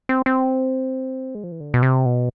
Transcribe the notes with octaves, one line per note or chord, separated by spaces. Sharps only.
C4
C4
G#3
F3
E3
D3
B2
C3
B2